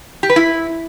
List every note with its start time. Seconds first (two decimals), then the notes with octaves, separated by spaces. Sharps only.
0.23 G4
0.30 B4
0.36 E4